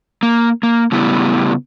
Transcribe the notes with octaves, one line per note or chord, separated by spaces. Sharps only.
A#3
A#3
A2 C#3 G3 B3 E4